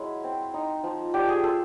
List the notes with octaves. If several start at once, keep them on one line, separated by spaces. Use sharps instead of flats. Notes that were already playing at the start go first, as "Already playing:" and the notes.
Already playing: F#3 G#3 C#4 E4
C4
D#4
F3
D4 G4
G#4
F4 A4